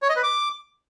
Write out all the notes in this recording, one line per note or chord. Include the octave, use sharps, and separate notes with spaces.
C#5
D#5
B4
D6